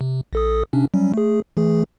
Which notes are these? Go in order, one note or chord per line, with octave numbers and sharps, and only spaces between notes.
C3
A#1 A4 D#6
C3 C#4 D4
F#3 G3 C#4
A3 G#4
E3 A3 G#4